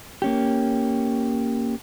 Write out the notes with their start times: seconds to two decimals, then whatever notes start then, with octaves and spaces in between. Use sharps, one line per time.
0.22 A#3 C#4 G4